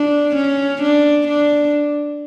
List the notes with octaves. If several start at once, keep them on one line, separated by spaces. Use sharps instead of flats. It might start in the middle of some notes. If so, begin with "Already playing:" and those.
Already playing: D4
C#4
D4
D4